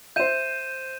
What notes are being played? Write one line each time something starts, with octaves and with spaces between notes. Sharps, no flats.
C5 E5 G6 D#7 E7